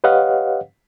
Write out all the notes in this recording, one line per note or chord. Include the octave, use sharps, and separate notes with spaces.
G4 B4 C#5 D#5 F5 F#5